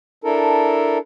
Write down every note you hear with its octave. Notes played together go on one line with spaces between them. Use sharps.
D4 E4 A4 A#4